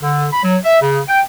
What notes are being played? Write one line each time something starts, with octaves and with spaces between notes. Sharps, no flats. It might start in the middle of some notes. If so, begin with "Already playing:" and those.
D3
B5
F#3
E5
C#3
G5